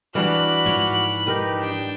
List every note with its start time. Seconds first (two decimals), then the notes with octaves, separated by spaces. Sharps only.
0.15 E3 G3 D4 F#4 B5 D6 F6 F#6
0.66 G#2 E3 F3 C#5
1.27 D#4 G4 A#4 B4
1.59 D4 G5